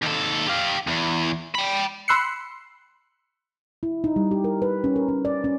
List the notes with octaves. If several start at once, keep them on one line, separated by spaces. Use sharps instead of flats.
D#2 A4
G4 F5
E2
G5 B5
B5 C6 E6 F#6 C7 C#7
E4
D#4
G3
G4
A#4
B4
C#4
A#4
C#4
D5
C#4